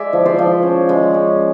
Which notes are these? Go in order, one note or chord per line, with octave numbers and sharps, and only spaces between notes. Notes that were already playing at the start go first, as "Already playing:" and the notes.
Already playing: G#3 D5 E5
F3
C5 D5
F3
C#4
G#3
C#4